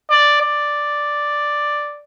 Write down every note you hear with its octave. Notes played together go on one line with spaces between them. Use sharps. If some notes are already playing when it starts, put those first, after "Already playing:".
D5
D5